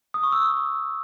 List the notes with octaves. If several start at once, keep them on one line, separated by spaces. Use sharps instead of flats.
D#6
C#6
E6